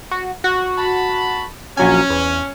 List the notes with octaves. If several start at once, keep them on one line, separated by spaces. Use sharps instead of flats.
F#4
F#4
A5 B5
A#1 F#3 C#4 G#5
E2